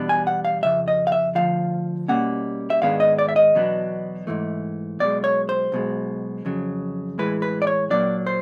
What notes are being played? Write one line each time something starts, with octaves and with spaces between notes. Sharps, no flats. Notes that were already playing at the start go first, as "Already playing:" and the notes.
Already playing: E2 B2 G3 B3 D4
G#5
F#5
F5
F2 C#3 E5
D#5
F5
E5
D2 C3 F3 F5
B2 G3 A#3 C#4 F#5
E5
G#2 D#3 G#3 B3 D4 F5
D#5
D5
E5
D#5
E2 B2 F#3 B3 D4
G#2 E3 A3
B1 B2 G#3 D5
C#5
C5
B1 B2 G#3
F2 C#3 F#3
A2 E3 G#3 B4
B4
D5
C#5
A#2 F#3 A#3 D4 D5
C5